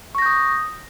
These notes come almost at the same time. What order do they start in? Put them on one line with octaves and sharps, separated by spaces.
C#6 A#6 G6 D#6